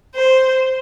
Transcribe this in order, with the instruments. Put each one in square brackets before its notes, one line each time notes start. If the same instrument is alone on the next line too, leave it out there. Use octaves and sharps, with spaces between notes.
[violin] C5